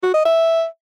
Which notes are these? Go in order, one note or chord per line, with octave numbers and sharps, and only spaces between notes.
F#4
D#5
E5